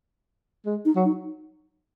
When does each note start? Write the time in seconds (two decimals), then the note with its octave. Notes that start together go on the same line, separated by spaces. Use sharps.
0.66 G#3
0.85 D#4
0.96 F#3
1.05 D#4